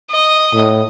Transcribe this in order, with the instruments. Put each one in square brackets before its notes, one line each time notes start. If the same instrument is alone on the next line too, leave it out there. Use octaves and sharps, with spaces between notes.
[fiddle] D#5
[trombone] A2